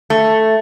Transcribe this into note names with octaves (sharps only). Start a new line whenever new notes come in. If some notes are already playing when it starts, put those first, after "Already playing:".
A3